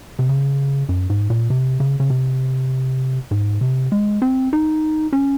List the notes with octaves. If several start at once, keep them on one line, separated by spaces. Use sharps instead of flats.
C3
C#3
F#2
G#2
A#2
C3
C#3
C#3
C3
G#2
C3
G#3
C4
D#4
C#4